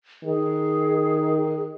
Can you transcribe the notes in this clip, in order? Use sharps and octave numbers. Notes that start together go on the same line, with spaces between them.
D#3 G#4